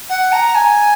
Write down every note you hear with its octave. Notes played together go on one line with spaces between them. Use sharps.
F#5
A#5
G#5